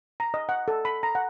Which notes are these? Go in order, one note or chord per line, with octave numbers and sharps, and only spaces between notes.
A#5
D#5
F#5
A4
B5
A#5
F#5